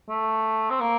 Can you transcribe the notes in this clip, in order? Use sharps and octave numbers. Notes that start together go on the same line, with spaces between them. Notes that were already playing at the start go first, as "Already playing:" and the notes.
A3
C4
A#3